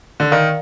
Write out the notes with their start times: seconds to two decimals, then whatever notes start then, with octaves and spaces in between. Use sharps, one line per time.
0.20 D3
0.31 D#3 A#4 D5 F5 A#5